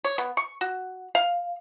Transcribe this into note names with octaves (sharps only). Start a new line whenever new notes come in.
C#5
B3
C#6
F#4
F5